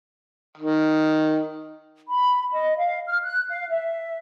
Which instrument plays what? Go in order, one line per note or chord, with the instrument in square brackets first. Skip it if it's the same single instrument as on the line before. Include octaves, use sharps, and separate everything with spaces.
[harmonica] D#3
[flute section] B5
D#5
F5
F6
F#6
F5
E5